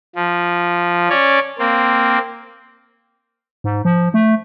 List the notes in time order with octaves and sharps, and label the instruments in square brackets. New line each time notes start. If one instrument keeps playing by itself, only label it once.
[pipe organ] F3
C#4 C#5 D5
A#3 C4
[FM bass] G#2
F3
A3